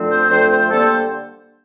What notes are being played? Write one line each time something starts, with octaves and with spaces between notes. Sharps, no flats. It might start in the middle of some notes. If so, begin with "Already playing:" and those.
Already playing: F2 D3 F3 A3 C4
C5
F2 D3 F3 A3 C4 C5
C5
D3 G3 A#3 A4
C5